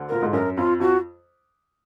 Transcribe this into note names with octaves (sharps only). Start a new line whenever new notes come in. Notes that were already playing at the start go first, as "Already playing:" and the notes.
Already playing: D2 D3
A#2 A#4
G#2
F#2 A#4
F2 F4
F2 F#4